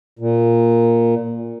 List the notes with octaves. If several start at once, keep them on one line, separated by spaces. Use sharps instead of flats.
A#2